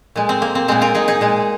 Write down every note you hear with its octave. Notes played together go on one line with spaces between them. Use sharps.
A#2 G#3
C4
A#3
C4
A#2 G#3 C4
F4 A#4
D#4 G#4
D#4 G#4
A#2 G#3